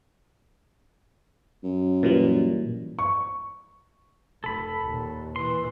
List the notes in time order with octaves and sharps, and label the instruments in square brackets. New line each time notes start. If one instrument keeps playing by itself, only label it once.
[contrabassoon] F#2
[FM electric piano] A#2 E3 G3
[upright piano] C#6
[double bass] F1 [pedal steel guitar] A4 B5
[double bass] D#2 A#2
[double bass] A#2 E3 [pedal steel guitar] C6